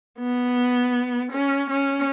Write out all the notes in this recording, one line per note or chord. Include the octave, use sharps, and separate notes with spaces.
B3
C#4
C#4